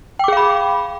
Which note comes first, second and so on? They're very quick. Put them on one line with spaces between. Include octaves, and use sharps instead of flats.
G5 D6 G#4 F5 B5